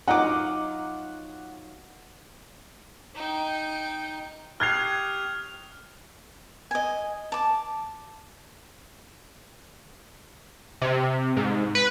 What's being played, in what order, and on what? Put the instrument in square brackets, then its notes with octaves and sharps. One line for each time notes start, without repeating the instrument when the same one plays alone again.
[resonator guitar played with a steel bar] F#3 D#4 F4 [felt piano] F#5 D6
[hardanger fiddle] D#4 G5
[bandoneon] G4 C#6 D#6 [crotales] F6 F7 [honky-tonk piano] F#6 G#6 C7
[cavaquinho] D#5 G#5
A5 D6
[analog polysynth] C3
G#2
B4